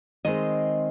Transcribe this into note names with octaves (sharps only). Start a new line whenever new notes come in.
D#3 G#3 C4 D#5